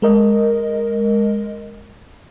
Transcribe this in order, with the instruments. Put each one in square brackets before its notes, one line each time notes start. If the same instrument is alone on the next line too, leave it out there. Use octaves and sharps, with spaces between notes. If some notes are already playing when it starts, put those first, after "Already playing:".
[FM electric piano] G#3 A#4 D#5